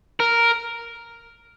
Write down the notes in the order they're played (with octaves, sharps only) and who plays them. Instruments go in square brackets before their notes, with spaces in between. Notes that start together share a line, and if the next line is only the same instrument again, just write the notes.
[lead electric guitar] A#4